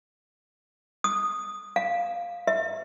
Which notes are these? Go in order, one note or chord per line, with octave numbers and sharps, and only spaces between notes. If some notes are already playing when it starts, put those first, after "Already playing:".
D#6
F5
E5